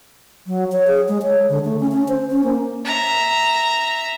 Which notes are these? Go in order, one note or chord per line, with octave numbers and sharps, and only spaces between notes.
F#3
C#5
G#4
G#3
C#5
D3
A3
C#4
C#4
C5
C#4
A#3
E5 A#5